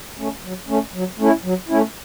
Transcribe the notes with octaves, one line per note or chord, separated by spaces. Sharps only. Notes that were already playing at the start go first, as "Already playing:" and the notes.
A3 C#4
F#3
A3 C#4
F#3
A3 C#4 E4
F#3
A3 C#4 E4